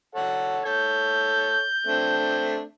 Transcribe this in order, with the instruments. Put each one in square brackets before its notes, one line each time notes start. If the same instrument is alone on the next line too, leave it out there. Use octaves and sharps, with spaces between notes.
[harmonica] A4 C#5 F#5
[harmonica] A4 C#5 [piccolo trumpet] G6
[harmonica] A3 C4 D4